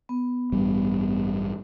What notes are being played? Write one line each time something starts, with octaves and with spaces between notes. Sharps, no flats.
B3
A1 G2 G3